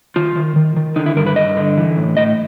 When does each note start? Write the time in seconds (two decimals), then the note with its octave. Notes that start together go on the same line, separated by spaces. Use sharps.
0.16 D#3 F4
0.36 D#3
0.56 D#3
0.77 D#3
0.96 D3 D#4
1.06 E4
1.17 G2 A#4
1.26 B4
1.36 G2 D#5
1.57 D3
1.77 E3
1.97 A2
2.17 A2 D#5